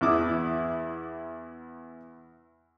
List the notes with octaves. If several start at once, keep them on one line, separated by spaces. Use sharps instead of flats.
E2 E4 D6 D#6